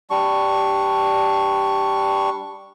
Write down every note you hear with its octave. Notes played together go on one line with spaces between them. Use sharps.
G3 D4 C#6